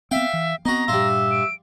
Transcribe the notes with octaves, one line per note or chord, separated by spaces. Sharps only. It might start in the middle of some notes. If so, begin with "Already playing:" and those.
B3 C4 E5 F5 G5
E3
B3 C4 D#4 F#4 A#5
G2 A#2 G3 F4 E5
D7